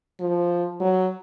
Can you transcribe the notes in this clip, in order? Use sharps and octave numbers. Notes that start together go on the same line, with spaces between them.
F3
F#3